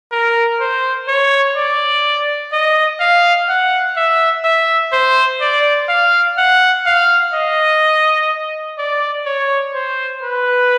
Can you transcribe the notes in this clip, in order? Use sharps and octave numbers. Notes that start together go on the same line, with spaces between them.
A#4
C5
C#5
D5
D#5
F5
F#5
E5
E5
C5
D5
F5
F#5
F5
D#5
D5
C#5
C5
B4